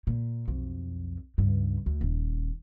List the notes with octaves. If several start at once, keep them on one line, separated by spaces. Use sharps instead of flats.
A#2
B1 F2
C#2 G2
D2
D#1